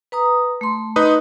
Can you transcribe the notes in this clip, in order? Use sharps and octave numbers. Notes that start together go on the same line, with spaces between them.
B4 A#5 D#6
A3 C6
D#4 B4 D#6